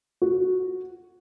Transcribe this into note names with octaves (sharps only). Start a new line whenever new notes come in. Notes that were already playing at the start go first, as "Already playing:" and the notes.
F#4